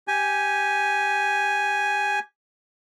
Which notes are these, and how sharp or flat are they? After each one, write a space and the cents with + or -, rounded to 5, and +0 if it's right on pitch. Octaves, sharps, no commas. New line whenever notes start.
G4 +0 G#5 +0